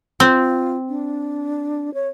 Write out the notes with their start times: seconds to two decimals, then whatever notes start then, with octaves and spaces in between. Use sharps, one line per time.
0.20 C4 F4
0.89 D4
1.94 C#5